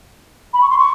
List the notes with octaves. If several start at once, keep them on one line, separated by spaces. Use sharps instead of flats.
B5
C#6
C6
C#6